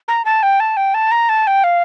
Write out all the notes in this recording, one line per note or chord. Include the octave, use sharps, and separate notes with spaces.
A#5
A5
G5
A5
G5
A5
A#5
A5
G5
F5